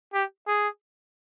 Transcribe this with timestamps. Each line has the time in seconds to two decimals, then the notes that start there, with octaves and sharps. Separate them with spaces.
0.13 G4
0.48 G#4